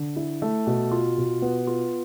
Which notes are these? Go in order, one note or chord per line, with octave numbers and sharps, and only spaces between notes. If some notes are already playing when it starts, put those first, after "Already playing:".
Already playing: D3
E4
A3
B2
F4
B2
B3
F4